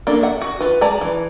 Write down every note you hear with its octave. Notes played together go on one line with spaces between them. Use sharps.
A#3 D4 A4
E5 F#5
F#4
F4 B4
G#3 D5 A5 A#5
E3